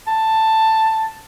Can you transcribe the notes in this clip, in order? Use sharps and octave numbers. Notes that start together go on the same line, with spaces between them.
A5